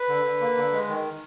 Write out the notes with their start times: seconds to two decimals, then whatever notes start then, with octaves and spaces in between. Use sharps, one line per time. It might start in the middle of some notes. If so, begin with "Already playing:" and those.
Already playing: B4
0.09 D3
0.25 D3
0.41 A#3
0.57 D3
0.73 G#3
0.88 D#3